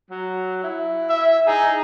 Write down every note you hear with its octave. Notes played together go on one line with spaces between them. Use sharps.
F#3
E4
E5
D#4 G#4